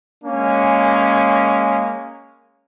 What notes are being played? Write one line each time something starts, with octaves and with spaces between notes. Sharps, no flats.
G#3 A#3 C#4